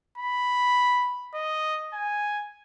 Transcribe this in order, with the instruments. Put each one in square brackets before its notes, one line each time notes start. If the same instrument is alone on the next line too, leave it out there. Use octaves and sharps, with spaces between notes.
[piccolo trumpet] B5
D#5
G#5